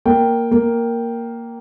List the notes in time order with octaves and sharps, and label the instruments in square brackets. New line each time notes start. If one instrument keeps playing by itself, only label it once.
[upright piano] A#3 G5
A#3